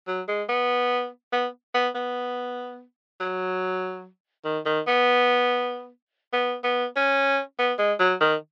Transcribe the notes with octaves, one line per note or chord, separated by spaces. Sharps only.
F#3
G#3
B3
B3
B3
B3
F#3
D#3
D#3
B3
B3
B3
C#4
B3
G#3
F#3
D#3